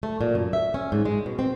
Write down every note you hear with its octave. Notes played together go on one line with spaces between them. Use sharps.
A3
A#2
F#2
E5
C#4
G#2
G#3
B2
C4